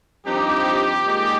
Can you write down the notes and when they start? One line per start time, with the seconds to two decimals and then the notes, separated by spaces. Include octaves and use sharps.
0.25 G2 F3 C4 D#4 G4
1.05 A#2 G#3 D#4